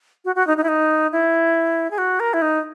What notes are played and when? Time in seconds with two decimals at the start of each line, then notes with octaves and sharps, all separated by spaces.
0.25 F#4
0.35 F#4
0.47 D#4
0.57 D#4
0.64 E4
0.68 D#4
1.12 E4
1.91 G#4
1.98 F#4
2.20 A#4
2.34 E4
2.42 D#4